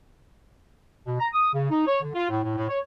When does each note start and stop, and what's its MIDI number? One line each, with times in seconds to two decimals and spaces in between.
1.06 1.16 47
1.20 1.28 82
1.33 1.52 87
1.54 1.68 49
1.71 1.86 63
1.87 2.01 73
2.02 2.11 50
2.15 2.26 65
2.30 2.42 45
2.43 2.53 45
2.56 2.67 45
2.69 2.79 73